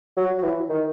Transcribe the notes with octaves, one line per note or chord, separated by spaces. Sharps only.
F#3
F#3
E3
D#3